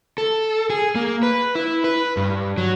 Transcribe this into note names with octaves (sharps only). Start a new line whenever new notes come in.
A4
G#4
A#3
B4
E4
B4
G2
F#3